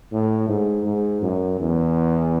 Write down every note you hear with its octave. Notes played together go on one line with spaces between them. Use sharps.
A2
G#2
G#2
F#2
E2